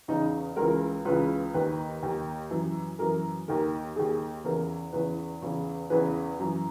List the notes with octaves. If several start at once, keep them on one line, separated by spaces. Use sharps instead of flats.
E2 C#3 E3 D#4
C#2 C#3 E3 A#4
C#2 C#3 E3 B4
D#2 D#3 B4
D#2 D#3
F#2 E3
F#2 E3 A#4
D#2 D#3 A#4
D#2 D#3 G#4
E2 C#3 E3 A#4
E2 C#3 E3 B4
E2 C#3 E3
E2 C#3 E3 B4
F#2 E3